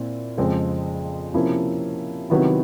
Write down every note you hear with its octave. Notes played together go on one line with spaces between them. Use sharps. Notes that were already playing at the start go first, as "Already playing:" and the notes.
Already playing: A#2 C4 E4
F2 C#3 F3 G#3 C4
C3 F3 A#3 C#4 E4
C3 D#3 F#3 B3 E4